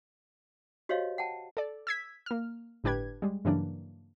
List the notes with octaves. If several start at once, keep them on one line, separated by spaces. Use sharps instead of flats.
F#4 G4 C5 C#5 D#5 F5
F#5 G5 A5
A4 D5
E6 G#6 B6
A#3 F6
G1 A2 D4 G4 B4 G#6
G3 G#3
G2 C#3 E3 F#3 A#3 D4